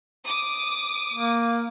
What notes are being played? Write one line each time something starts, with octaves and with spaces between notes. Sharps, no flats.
D6 D#6
A#3